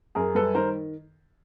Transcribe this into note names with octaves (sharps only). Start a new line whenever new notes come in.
F#2 G#4 A#4
G3 A4 B4
D#3 A#4 C5